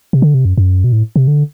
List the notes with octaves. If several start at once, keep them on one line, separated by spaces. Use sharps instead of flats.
C3
D3
C3
F#2
F#2
B2
A2
C3
D3